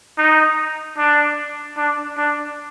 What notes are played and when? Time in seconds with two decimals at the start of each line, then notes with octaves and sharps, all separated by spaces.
0.18 D#4
0.97 D4
1.77 D4
2.17 D4